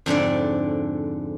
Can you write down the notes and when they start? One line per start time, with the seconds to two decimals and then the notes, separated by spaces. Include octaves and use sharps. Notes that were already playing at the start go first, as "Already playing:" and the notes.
0.06 F2 G#2 D3 D5